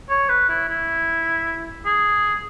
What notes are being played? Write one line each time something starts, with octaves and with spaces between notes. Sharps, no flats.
C#5
B4
E4
E4
G#4